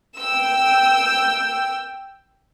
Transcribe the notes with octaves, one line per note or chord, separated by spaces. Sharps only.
G5 E6